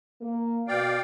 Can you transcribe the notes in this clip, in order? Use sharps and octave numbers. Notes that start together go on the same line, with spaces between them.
A#3
B2 D5 F5 G5